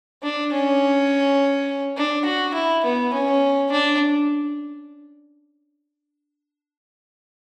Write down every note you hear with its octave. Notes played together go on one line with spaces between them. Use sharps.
D4
C#4
D4
F#4
E4
B3
C#4
D4